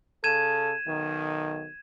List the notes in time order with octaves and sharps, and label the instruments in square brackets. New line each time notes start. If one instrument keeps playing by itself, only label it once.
[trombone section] C#3 A4 [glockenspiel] G#6 D#7 E7
[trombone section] B1 D#3